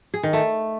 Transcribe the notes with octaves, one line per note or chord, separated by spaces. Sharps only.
G#4
D#3
A3